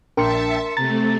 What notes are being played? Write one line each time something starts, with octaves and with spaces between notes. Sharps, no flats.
A#1 D4 A#4 E5 G5 A5 C6 C#7
C3 A3 A#5 A6